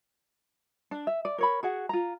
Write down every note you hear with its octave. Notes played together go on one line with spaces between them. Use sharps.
D4
E5
D5
A#4 C#5 B5
F#4 G#4 F#5
F4 A#5